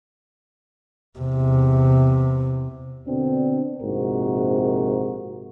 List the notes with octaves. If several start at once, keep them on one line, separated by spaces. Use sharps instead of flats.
E2 C3
B2 D3 C4 D4
A#1 G#2 C3 F#4 A#4